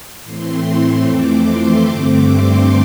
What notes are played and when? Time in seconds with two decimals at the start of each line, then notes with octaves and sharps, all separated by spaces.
0.23 A2 E3 A3 C4 C6
1.03 F2 E3 A3 C4 D6
1.44 C6
1.84 G2 D3 A3 C4 D6
2.24 C6